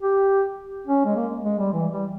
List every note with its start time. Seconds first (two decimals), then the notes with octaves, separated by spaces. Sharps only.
0.02 G4
0.87 C#4
1.05 G#3
1.16 A#3
1.45 G#3
1.59 G3
1.73 E3
1.92 G3